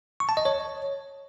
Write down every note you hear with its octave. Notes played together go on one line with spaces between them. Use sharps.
C#6
A5
D#5
C#5